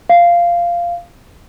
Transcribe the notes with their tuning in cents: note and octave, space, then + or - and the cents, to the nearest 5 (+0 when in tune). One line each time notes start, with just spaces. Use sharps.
F5 -10